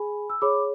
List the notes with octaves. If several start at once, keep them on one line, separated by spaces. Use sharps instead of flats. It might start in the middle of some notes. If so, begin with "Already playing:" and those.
Already playing: G#4 G#5 B5
E6
G#4 C#5 B5 D6